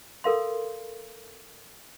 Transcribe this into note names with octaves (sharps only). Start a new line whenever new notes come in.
A4 A#4 F5 C6